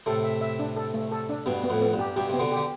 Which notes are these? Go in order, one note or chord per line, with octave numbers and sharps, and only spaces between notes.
A2 C3 A4
E5
E5
D4
A4
A3
A4
D4
G2 B2 B3
B3
F2 A2
B3
G2
G4
G2 B2 G4
C3 B3
B2 D3
D3 G4